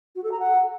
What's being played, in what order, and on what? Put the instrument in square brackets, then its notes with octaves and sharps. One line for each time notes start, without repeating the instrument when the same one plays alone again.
[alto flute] F#4
A4
A#5
F#5